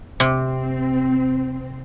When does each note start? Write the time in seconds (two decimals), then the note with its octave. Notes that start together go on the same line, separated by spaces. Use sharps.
0.20 C3 C4